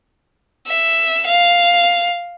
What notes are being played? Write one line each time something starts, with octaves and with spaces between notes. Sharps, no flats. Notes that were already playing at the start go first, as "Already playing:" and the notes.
E5
F5